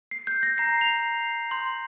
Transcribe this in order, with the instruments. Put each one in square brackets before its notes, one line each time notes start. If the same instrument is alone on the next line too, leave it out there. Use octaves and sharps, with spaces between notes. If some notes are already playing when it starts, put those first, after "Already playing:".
[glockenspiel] C7
G6
A#6
A#5 G6 C7
F7
C6 G6